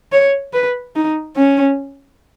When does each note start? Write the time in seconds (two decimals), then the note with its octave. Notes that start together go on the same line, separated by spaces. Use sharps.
0.12 C#5
0.53 B4
0.96 D#4
1.36 C#4